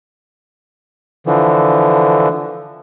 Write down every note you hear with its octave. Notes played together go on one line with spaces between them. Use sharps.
D3 E3 F3